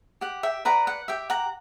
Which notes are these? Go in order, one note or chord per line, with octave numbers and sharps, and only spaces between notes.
G4 F#5
E5 G5
B4 D5 F#5 A#5
F#5
G4 E5 G5
F#5 A#5